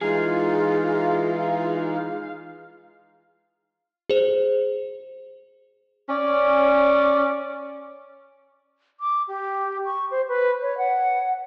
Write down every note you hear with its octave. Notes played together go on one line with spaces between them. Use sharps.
E3 G#3 D#4 F4 G#4 F5
G#4 C5
C#4 D5
D6
G4
C#6
C5
B4
C#5
F#5